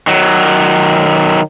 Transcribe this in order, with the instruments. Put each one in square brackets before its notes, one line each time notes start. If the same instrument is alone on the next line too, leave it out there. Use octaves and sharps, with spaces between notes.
[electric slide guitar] D#3 F#3